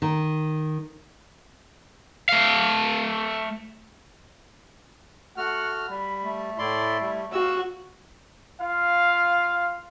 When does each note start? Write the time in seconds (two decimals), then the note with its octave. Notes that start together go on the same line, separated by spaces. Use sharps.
0.02 D#3
2.29 A3 F5
5.37 A3 F#4 F#5 F6
5.90 G3 B5
6.24 A3
6.59 A2 E4 D5 C6
7.02 G3
7.33 F#4 F5 E6
8.61 F4 F5